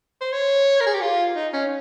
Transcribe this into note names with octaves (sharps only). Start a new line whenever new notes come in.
C5
C#5
A#4
G#4
G4
F4
D#4
C#4